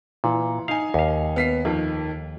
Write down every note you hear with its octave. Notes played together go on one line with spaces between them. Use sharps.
A#2 E3
D#4 F5 G#5
D#2 F5
B3 B6 C7
F2 D#3